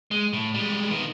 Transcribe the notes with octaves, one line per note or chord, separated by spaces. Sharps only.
G#3
A2
G3 G#3
D#3 B3